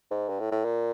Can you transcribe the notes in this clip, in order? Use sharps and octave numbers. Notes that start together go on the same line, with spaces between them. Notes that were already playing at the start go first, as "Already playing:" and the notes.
G#2
G2
A2
A2
A#2